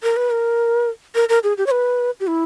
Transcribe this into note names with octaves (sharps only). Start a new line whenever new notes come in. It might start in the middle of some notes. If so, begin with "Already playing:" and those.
A#4
B4
A#4
A#4
A#4
G#4
G4
C#5
B4
G4
E4